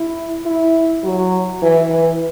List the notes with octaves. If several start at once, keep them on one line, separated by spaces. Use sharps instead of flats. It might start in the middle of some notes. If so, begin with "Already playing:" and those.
Already playing: E4
E4
F#3
E3
E3